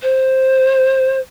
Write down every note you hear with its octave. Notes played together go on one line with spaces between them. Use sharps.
C5